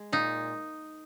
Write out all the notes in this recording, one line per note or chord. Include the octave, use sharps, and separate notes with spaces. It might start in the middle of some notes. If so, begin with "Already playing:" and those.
Already playing: G#3
A#2 D#4